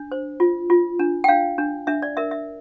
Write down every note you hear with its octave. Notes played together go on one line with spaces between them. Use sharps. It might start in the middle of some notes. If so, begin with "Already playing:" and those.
Already playing: D4
C5
F4
F4
D4
G5
D4 F5
D4
D4 E5
D5
A#4 E5
E5